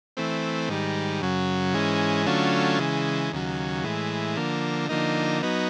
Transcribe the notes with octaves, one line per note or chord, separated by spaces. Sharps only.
E3 A3 C4
G#2 D#3 G3
F#2 C#3 F#3
G#2 E3 G#3 C#4
D3 F#3 A3 C#4 F4
C#3 E3 G#3
D#2 C#3 F#3
A2 E3 G#3
D3 F3 A#3
D3 F3 A#3 D#4
F#3 B3 D#4